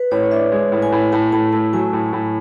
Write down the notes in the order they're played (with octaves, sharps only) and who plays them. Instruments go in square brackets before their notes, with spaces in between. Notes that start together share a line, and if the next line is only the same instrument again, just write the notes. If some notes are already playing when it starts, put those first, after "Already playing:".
Already playing: [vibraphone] B4
[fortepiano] A2 [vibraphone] C#5
[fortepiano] D4 [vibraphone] E5
[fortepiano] G#3
A2
[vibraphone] G#5
[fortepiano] A2
[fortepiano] A2 [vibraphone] A5
[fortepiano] A2 [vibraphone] A5
[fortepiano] A3 [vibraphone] A5
[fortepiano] F#3 [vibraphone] G#5
[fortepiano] A2
A2